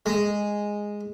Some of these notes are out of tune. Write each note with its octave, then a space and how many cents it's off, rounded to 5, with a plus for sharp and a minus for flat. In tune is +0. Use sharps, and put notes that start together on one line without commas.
G#3 -5